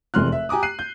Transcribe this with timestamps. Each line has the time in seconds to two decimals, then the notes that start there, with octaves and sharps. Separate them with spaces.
0.14 F1 E2 C3 C6 F6 F#6
0.32 E5
0.49 G4 G#5 A#5 D6 D#6
0.63 F#6 C7 D#7
0.79 G6